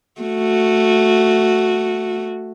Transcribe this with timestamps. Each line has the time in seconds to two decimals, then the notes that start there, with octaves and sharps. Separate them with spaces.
0.21 A3 F#4